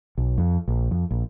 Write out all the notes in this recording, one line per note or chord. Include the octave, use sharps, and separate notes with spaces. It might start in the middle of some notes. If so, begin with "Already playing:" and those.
B1
F2
A#1
F2
A#1